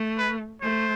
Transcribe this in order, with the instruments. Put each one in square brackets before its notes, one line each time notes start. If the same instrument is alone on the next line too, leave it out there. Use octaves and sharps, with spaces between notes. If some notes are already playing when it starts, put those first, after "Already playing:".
Already playing: [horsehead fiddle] A3
[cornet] B4
[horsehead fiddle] A3 [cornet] C5